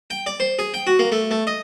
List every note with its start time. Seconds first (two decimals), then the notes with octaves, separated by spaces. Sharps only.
0.10 G5
0.26 D5
0.40 C5
0.59 G#4
0.74 G5
0.87 F#4
0.99 A#3
1.12 A3
1.31 A3
1.47 D#5